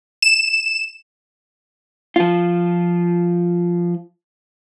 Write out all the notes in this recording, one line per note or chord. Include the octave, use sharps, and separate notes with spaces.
E7
F3 F4